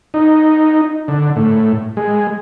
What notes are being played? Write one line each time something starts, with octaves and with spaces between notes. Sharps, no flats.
D#4
D3
A2
G#3